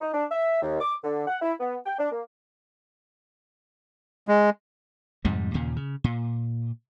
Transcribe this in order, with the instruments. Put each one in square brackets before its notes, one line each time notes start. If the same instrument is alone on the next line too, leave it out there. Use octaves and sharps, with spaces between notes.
[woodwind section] D#4
D4
E5
D#2
D6
D3
F#5
E4
B3
G5
D4
A#3
[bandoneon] G#3
[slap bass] F2 G#2 C3 G3
D#2 A#2 C#3
C#3
A#2